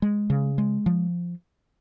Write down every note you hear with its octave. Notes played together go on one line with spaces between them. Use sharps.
G#3
C#3
G#3
F3